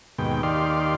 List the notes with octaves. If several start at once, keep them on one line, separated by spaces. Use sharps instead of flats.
D#2 G#2 B2 G5
D#2 D#3 G4 D5 F5 C6